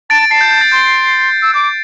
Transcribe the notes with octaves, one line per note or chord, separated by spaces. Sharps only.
A5 A6 D7
A5 C7
G6
G6
A6
C6 G6
E6
D6 G6